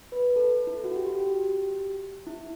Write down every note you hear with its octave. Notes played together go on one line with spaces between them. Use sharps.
B4
A4
E4
F#4
G4
G4
G4
E4